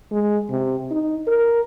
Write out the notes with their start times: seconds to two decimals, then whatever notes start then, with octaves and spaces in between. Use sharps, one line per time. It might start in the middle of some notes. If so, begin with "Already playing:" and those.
0.12 G#3
0.50 C3
0.91 D#4
1.27 A#4